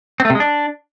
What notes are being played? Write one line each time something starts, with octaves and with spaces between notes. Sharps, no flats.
C4
A3
C3
G#3
D4